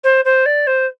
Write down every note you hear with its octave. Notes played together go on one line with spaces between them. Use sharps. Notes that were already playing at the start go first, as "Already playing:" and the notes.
C5
C5
D5
C5